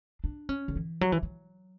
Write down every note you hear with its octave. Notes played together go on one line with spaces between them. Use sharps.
D4
C#4
D3
E3
F#3
E3
F#3